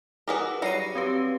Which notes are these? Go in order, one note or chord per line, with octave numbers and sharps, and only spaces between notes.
F#4 G#4 A#4 B4 F#5 D6
F#3 G3 F#4 A#6 C7 D#7
C4 G4 B4